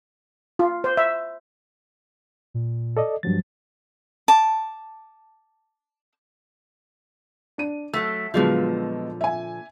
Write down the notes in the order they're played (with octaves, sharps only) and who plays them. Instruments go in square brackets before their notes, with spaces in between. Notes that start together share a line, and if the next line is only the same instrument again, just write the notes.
[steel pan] F4
C5
E5
[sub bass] A#2
[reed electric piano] A4 D5 D#5
[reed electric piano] G2 F#3 A6 [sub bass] F3
[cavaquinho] A5 D6
[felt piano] D4 D#7
[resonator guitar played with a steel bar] F#3 A3 [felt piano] E6
[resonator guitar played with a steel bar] A#2 D3 F3 [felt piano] F#3 G#3 B3
[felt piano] E5 G#5